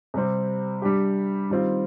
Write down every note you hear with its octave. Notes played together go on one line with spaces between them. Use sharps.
C3 G3 C4
G3 D4 G4
D#3 G3 C4 F4